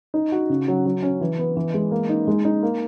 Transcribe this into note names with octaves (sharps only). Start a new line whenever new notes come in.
D#4
F#4
C#3
F#3
F#3
C#4
E3
B3
E3
G#3
A#3
D#4
G#3
D#4
A#3